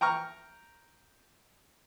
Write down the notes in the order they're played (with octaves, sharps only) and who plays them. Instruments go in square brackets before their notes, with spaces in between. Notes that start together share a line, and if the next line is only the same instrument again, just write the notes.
[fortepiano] G5 A#5 C#6 F6